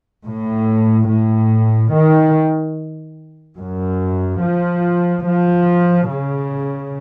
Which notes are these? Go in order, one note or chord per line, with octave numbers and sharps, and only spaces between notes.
A2
A2
D#3
F#2
F3
F3
C#3